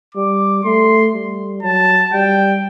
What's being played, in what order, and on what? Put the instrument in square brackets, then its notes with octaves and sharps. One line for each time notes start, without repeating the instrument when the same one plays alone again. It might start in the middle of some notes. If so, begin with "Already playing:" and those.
[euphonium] G3 [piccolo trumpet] D6
[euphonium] A3 [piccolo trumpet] C6
[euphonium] G3
[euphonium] F#3 [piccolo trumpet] A5
[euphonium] G3 [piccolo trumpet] G5